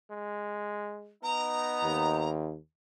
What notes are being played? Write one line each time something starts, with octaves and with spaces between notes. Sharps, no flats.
G#3
B3 D#4 A#5
D#2